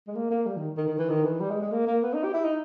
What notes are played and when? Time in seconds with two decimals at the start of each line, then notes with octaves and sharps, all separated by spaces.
0.08 G#3
0.15 A#3
0.30 A#3
0.46 G3
0.56 D#3
0.77 D#3
0.87 D#3
0.99 E3
1.09 D#3
1.24 E3
1.40 G3
1.50 G#3
1.62 G#3
1.72 A#3
1.87 A#3
2.03 B3
2.13 D#4
2.23 G4
2.34 E4
2.44 D#4